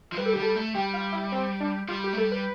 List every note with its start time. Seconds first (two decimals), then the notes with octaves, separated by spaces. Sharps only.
0.12 F3
0.17 G3 B4
0.26 A4
0.33 G4
0.37 G3
0.42 A4
0.56 A3
0.75 G3 G4
0.94 F4
1.12 E4
1.32 C4
1.60 D4
1.88 G3 F4
2.04 G4
2.13 A3
2.17 G3 A4
2.32 B4